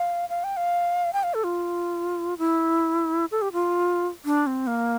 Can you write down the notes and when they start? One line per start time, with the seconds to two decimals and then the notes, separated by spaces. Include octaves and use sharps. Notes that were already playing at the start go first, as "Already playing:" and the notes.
Already playing: F5
0.29 F5
0.44 G5
0.57 F5
1.13 G5
1.23 F5
1.34 A4
1.44 F4
2.38 E4
3.31 A4
3.42 G4
3.53 F4
4.25 D4
4.47 C4
4.67 A#3